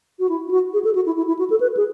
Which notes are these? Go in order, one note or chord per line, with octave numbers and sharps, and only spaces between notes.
F#4
E4
E4
F#4
G#4
A4
F#4
E4
E4
E4
F#4
A4
B4
G#4